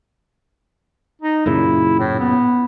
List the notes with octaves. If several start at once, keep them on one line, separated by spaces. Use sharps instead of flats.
D#4
F#2 A#2 C#3 E4
A2
B3